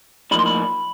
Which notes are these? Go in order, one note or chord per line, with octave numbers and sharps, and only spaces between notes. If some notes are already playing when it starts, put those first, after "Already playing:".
A2 F3 A#3 D#4 B5
C6
B5